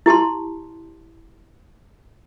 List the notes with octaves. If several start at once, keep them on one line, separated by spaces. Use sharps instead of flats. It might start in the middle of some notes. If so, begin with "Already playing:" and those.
E4 G4 A5 C6